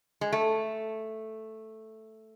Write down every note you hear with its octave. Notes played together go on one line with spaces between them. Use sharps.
G#3
A3